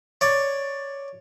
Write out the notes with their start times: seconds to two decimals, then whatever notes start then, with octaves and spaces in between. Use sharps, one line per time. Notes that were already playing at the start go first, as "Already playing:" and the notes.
0.21 C#5 D5